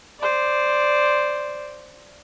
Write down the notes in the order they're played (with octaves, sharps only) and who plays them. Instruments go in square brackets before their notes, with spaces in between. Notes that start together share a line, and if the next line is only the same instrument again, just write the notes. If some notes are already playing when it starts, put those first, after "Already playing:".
[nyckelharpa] C5 D5